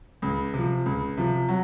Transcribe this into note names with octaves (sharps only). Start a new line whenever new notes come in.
C#2
C3 F3
C#2
C3 F3
F#3